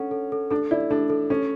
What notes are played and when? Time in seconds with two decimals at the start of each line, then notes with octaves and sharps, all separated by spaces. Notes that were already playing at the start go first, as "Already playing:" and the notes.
Already playing: C#4 D4 A4 F#5
0.11 A4
0.32 A4
0.51 D4 A4
0.71 E4 D5
0.90 D4 A4
1.10 A4
1.30 C#4 A4